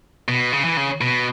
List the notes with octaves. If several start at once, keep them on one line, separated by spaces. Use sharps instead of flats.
B2
C#3
E3
C#3
B2